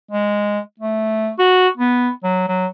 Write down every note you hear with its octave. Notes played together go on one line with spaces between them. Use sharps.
G#3
A3
F#4
B3
F#3
F#3